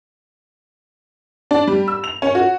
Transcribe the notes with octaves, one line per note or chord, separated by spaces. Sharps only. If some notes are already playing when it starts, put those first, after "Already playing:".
D4
G3
E6
F7
C#4
F#4